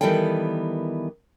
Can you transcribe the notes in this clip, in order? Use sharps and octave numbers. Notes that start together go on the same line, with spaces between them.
D#3 E3 G3 B3 A4 G5